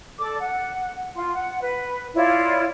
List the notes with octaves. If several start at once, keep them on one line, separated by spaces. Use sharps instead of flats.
A4 D5 D6
F#5
F4 C6
F#5
B4
E4 F4 C#5 D5